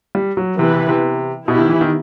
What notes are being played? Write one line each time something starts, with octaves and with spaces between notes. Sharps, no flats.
G3
F#3
C3 E3 B3 E4 B4
C3
C3
B2 B3 E4 G4
D#3
E3
D#3